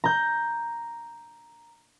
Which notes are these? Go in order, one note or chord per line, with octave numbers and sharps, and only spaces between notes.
A#5 G6